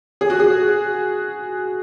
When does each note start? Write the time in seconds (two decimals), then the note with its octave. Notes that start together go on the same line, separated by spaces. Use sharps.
0.21 G#4
0.30 F#4
0.39 G#4